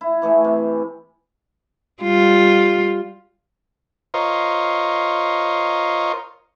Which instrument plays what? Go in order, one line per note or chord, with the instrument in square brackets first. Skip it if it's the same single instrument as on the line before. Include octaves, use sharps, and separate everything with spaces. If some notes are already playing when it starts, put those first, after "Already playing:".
[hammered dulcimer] E4
E3 A3 G#4
C3
[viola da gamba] G3 F4
[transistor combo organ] F4 A#4 C5 C#5 D#5